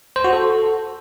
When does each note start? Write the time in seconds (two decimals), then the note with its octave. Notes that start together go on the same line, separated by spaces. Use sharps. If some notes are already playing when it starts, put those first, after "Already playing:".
0.16 C5
0.24 F#4
0.33 A4